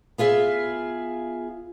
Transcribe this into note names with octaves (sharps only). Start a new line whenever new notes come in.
B3 F4 G#4 E5